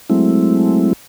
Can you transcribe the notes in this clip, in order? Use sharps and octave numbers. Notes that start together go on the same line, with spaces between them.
F#3 G#3 A3 C4 E4